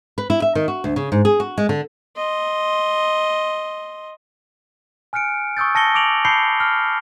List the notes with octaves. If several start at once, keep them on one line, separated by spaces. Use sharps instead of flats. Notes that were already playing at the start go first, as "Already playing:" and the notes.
B4
E4
E5
D#3
F#4
D2
C#3
G#2
G#4
F#4
G#3
D3
D#5 C6
G#5 F6 F#6 C#7 D7
C#6 D#6 E6 G6 A6
A5 A#6 C#7 G7
D6 D7 F7 F#7
A5 B5 G6 C7 C#7 G7
F6